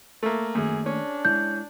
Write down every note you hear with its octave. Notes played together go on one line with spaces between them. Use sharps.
A3 A#3
F#2 D#3 A3 A#3 G#4
C#4 D4
G#3 E4 G6